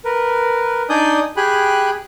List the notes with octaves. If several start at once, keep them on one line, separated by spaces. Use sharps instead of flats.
A#4 B4
D4 D#4 D5 G#5 D#6 G6
G4 G#4 G5 G#5 B5 F#6